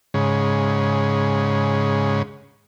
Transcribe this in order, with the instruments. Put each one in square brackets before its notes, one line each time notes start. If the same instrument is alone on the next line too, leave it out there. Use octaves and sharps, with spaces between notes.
[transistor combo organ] G#2 C#3